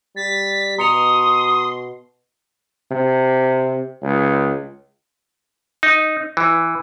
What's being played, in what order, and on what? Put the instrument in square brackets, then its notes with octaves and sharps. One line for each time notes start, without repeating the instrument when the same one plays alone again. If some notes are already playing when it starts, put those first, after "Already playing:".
[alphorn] G3 [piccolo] A6 [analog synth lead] B6
[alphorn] B2 [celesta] A#5 C#7 F7 [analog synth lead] C6 [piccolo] D#6
[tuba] C3
C#2
[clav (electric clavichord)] D#4
E3